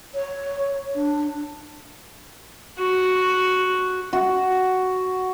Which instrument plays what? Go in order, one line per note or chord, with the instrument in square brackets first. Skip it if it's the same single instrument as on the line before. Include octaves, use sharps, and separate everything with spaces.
[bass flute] C#5
D4
[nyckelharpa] F#4
[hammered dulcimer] F#4